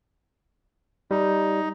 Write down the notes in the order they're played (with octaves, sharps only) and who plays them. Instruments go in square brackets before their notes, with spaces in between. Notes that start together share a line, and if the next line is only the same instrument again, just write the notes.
[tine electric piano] G3 [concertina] D#4